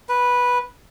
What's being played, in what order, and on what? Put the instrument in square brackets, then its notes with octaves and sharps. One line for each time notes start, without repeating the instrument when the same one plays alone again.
[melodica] B4